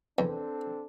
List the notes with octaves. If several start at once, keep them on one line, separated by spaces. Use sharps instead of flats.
E2 C4 D4 A4